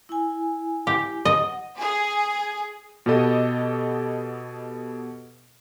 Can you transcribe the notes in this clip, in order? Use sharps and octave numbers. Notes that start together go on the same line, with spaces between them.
E4 G#5
G4
D#5 F#5
G#4
B2 B3 G4 A4 D#5 D#7